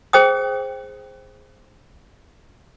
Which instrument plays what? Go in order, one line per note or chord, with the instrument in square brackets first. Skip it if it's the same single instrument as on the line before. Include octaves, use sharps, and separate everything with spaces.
[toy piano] G#4 C5 G5 D#6